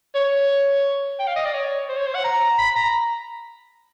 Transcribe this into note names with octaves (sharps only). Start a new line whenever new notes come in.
C#5
G5
F5
D#5
D5
C#5
C5
C#5
C5
F#5
A#5
B5
A#5